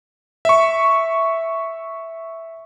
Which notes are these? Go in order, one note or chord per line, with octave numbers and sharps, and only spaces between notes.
E5 C#6